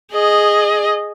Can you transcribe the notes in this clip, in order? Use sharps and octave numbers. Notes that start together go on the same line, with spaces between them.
G#4 D#5